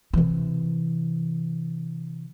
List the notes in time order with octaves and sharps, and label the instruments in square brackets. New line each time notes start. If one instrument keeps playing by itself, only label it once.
[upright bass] C3 E3